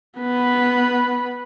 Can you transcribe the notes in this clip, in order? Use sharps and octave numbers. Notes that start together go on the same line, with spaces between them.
B3 B4